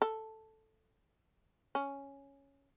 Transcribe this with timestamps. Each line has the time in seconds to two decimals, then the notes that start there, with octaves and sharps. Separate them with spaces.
0.02 A4
1.75 C#4